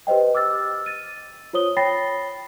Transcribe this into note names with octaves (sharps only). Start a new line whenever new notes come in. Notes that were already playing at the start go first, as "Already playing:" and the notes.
G4 B4 C5 D#5 G5
D6 E6 F6 A6
A6 D#7
F4 C5 C#5 D#6 G7
C#5 G5 B5 A6 A#6 C7